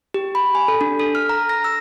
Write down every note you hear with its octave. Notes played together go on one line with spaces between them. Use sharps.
G4
B5
G#5
A4
D4
A4
F6
A#5
A#6
E6